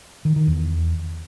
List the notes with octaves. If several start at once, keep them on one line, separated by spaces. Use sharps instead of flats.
D#3
D#3
E2